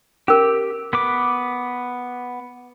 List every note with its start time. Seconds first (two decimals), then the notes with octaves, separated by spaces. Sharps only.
0.28 C#4 G4 A#4
0.93 B3 B4 D6